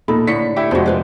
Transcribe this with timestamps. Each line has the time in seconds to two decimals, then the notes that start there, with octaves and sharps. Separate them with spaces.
0.08 A#2 D#4 A4 B5
0.27 A2 D3 B6 C#7
0.56 E4 G4 E5 G5
0.71 F2 C3 G#3 F#4 C5
0.86 F4 B4 C5